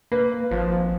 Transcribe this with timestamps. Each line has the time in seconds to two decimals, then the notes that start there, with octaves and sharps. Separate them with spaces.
0.12 A#3 B4
0.51 G#1 F3